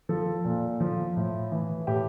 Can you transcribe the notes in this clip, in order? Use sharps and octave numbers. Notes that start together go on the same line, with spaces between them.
F3 A4
A#2
F3
A2
E3
A2 G4